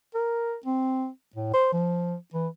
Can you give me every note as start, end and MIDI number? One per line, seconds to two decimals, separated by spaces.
0.15 0.55 70
0.66 1.08 60
1.36 1.49 45
1.54 1.68 72
1.73 2.16 53
2.34 2.48 52